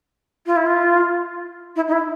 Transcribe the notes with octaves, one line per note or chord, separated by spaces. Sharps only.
F4
E4
F4
E4
D#4
E4